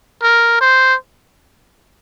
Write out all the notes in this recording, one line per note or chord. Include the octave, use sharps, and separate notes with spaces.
A#4
C5